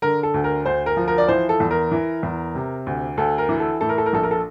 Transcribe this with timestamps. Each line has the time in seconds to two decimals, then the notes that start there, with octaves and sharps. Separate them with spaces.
0.02 D3 A#4
0.23 A4
0.34 D2
0.44 A#4
0.65 D2 C5
0.86 A#4
0.97 F3
1.08 A#4
1.18 D5
1.28 E3 C5
1.49 A4
1.60 E2
1.71 A#4
1.92 E3
2.23 E2
2.55 C3
2.86 D2
3.17 D2 A4
3.38 A#4
3.49 E3
3.60 A4
3.81 A2 A4
3.89 A#4
3.98 A4
4.06 A#4
4.13 A#1 A4
4.23 A#4
4.31 A4